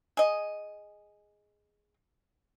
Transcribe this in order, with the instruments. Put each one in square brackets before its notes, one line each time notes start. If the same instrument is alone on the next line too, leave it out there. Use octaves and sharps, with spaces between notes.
[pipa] G#4 D#5